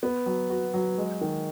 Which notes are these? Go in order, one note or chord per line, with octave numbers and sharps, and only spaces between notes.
B3
F#3
F#4
F#3
G#3
D#3